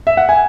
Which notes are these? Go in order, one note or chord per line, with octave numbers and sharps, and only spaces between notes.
E5
F#5
G#5